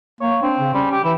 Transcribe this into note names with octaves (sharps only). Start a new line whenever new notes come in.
A#3 C#5
C4 D4
C#3
G3 C#4
G4
E3 E4